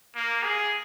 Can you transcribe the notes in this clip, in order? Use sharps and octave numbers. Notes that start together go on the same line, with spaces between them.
A#3
G#4